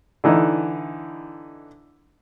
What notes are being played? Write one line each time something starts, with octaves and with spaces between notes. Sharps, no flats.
D3 E3 D#4 E4